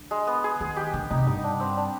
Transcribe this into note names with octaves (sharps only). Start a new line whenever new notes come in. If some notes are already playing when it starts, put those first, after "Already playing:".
Already playing: D3
G#3
B3
G#4
D#3 G#4
G4
D3
C3 D#4
G2 D#4
D4
C4
D4